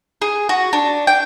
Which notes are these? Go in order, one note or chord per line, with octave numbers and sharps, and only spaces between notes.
G#4
F#4
D4
G5